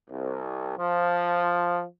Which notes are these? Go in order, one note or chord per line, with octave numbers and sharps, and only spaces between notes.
C2
F3